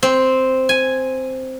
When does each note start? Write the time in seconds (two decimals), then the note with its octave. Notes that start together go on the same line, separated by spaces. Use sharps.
0.03 C4
0.69 G#5